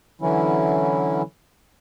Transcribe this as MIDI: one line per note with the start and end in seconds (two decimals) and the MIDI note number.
0.21 1.22 50
0.21 1.22 52
0.21 1.22 54
0.21 1.22 61
0.21 1.22 64